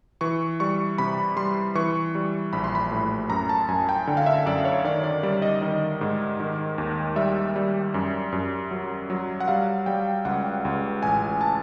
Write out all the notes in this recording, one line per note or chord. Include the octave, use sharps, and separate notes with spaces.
E3 C#6
G3 C#6
C3 B5
G3 C6
E3 C#6
G3
A#1 B5
C6
B5
A2
F#2 A#5
A5
F#2 G#5
G5
D3
F5
E5
F#2 D5
C#5
D#3 D5
D5
G3 D5
D#5
D#3
G#2
D#3
D#2
G3 E5
G3
F#2
F#2
F#3
F#3
F#5
G3 F5
G3 G5
C#2 F#5
C#2
A1 G#5
A5